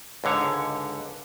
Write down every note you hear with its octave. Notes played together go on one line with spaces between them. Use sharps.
C#2 G#2 D3 C#5